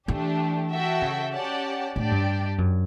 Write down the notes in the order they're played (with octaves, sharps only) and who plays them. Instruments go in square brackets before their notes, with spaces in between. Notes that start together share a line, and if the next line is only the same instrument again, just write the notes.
[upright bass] E3 [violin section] A3 D4 G4
[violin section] F#4 A4 E5 G5
[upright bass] C#3
[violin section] C#4 G4 D5 F#5 A5
[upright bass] A2 [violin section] D4 G4 D5
[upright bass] G2
F#2